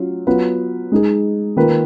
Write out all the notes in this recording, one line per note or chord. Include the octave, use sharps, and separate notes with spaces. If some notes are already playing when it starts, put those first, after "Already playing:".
Already playing: F#3 C#4 F4
F#3 B3 F4 B4
G#3 D#4 G#4
D#3 A#3 F4 B4